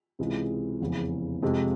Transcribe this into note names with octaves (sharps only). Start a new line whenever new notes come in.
C#2 C3 E3 G#3
F1 E2 C#3 E3
F2 C3 F3 G#3